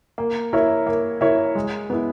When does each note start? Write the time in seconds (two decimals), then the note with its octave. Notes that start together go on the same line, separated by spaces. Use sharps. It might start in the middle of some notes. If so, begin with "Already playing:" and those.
0.18 A#3
0.53 E4 A#4 C#5 E5
0.87 A#3
1.21 E4 A#4 C#5 E5
1.55 G#3
1.90 B3 E4